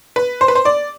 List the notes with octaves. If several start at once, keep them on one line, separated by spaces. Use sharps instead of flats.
B4
C5
B4
C5
D5